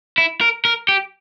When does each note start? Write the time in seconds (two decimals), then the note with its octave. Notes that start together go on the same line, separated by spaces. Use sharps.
0.18 E4
0.41 A#4
0.65 A#4
0.89 G4